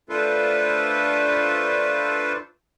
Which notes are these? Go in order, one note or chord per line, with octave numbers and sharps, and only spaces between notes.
A3 D4 F4 A4 B4 C5